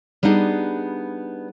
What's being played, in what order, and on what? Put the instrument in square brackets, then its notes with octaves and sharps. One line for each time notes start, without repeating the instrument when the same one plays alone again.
[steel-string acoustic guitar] G3 B3 D4 D#4 G#4